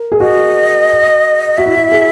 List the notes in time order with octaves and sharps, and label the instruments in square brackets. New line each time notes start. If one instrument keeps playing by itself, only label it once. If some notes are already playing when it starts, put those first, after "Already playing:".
Already playing: [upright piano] A#4
G#4
[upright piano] F#4 [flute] D#5
[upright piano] F#4 [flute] E5
[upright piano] E4
F#4
G#4